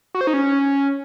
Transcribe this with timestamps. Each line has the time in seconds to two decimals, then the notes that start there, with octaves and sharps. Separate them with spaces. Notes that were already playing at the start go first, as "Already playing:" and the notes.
0.15 F#4
0.21 C5
0.27 D#4
0.34 C#4